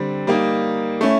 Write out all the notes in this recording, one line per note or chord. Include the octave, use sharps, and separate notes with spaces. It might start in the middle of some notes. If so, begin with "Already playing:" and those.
Already playing: D3 G3 C4
G3 A#3 D#4
A3 C#4 E4